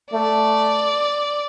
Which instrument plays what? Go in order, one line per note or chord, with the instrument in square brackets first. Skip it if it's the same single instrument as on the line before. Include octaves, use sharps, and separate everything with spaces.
[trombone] A3 [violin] D5